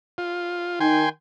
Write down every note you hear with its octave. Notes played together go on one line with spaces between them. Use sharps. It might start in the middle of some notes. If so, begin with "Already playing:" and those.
F4
D#3 D#4 G5 G#5 C6